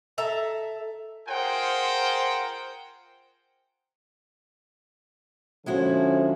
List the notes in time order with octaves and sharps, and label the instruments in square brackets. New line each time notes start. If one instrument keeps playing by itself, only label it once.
[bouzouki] A4 E5 A#5
[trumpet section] F4 G#4 A#4 C5 F#5 G5
[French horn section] D3 F3 C#4 [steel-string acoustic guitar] G#3 E4 F#4